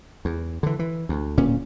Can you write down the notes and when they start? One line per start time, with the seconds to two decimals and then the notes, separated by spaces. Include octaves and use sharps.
0.25 E2
0.63 D3 E3
0.79 E3
1.09 D2
1.38 D1 A#2 C#4